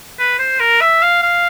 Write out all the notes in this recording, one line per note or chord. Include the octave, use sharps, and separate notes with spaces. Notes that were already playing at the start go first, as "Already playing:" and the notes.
B4
C5
A#4
E5
F5
F5